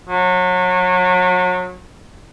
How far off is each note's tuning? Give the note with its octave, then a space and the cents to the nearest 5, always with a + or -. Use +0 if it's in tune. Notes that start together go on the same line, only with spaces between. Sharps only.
F#3 -30